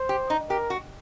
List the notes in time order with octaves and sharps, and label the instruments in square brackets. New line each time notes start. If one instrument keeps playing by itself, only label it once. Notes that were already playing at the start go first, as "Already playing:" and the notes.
Already playing: [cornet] C5
[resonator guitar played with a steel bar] G4
D#4
[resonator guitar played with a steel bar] G4 [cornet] A#4
[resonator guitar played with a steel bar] F#4